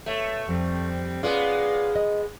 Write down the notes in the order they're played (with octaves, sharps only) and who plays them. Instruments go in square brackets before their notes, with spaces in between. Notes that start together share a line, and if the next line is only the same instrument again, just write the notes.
[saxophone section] B2 C#5 E5 [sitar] A3
[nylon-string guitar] F2 [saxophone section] G3 C4
[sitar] G#3 B3 [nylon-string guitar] C#4 F4 B4 [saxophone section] D5 F5
[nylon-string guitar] D#5